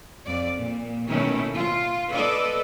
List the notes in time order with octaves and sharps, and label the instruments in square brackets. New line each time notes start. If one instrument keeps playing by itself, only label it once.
[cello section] F2 D5
A#2
B2 D#3 A3 C#4 E4
F4
A4 B4 D5 D#5